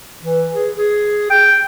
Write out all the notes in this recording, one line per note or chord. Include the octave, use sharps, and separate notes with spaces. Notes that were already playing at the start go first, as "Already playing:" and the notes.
E3
G#4
G#4
G5